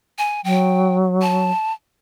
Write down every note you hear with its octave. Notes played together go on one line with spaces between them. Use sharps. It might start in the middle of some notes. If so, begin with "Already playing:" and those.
G#5
F#3 G5
A5